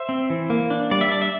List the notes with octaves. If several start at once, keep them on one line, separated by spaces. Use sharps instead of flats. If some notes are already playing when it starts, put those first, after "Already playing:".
Already playing: C5 E5
C4
E3
A#3
D4
G3 D5
E5
D4 D5
E5